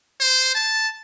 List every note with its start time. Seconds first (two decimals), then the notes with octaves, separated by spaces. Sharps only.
0.20 C5
0.55 A5